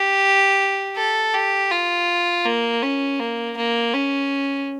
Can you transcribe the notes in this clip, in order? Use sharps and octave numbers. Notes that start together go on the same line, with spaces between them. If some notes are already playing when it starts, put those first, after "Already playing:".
Already playing: G4
A4
G4
F4
A#3
C#4
A#3
A#3
C#4